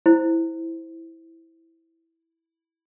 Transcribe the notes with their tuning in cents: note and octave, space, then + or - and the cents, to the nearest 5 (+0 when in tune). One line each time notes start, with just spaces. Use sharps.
E4 -5 C5 +0